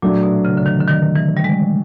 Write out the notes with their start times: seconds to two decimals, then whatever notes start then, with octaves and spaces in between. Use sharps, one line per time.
0.02 A#2 F#3 A3 D4
0.23 B2
0.45 C#3
0.57 D3
0.66 D#3
0.80 D3
0.87 D#3
1.16 E3
1.37 G3
1.44 G#3